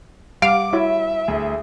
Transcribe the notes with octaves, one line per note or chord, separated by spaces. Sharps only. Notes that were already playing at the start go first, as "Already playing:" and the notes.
G3 F5 F#5 D6 D7
E4 F#4 C#5 E5
D2 G#4